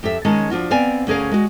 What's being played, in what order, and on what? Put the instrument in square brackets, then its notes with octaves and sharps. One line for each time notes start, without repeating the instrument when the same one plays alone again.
[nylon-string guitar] F2 G4 A4 E5
D#3 G#3 C#4 A5
F3 D4 F4 F#4
B3 C4 D5 F5 G#5
D2 C#4 G#4 A#4 F5
G#3 F#4